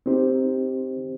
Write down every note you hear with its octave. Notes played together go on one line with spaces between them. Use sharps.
C4 D#4 G4 C5